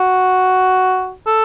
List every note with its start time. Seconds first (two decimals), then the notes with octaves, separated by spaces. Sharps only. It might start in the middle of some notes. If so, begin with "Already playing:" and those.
Already playing: F#4
1.27 A4